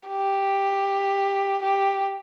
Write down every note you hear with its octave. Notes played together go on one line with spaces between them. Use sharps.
G4
G4